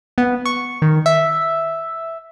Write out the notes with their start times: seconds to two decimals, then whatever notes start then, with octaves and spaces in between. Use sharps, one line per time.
0.18 B3
0.46 C#6
0.82 D#3
1.06 E5